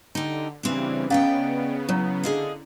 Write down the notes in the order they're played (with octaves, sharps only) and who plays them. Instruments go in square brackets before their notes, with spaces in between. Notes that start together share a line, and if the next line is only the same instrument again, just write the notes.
[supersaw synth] D3 [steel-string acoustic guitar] D#4 G4
[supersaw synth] C#3 E3 G3 [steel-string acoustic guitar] C4 D4
[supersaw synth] C#3 B3 [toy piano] C#4 F5 A#5 [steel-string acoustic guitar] D5 D#5 G5
[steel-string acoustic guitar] F#3 [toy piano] E4 C#5 A#5
[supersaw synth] D3 [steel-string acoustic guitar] G#4 D#5 F5